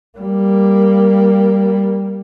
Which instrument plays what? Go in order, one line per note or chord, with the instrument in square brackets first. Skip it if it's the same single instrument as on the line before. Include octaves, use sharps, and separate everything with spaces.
[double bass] G3 A#3